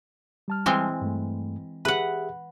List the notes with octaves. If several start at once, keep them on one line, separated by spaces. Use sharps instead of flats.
G3 A5 F6
E3 G#3 C4
G2 A3
G4 G#4 B4 E5 F#5